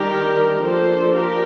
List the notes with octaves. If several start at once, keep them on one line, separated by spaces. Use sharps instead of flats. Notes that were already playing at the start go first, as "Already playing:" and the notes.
Already playing: D#3 G3 D4 G4 A#4
F3 A#3 D4 A4 C5
G4 A#4